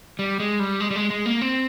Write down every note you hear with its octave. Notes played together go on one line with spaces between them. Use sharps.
G3
G#3
G3
G#3
G3
G#3
G#3
A#3
C4